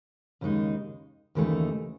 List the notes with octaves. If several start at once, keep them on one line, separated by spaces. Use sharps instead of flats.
D#2 C#3 G#3 D#4
D#2 C#3 E3 A3 D#4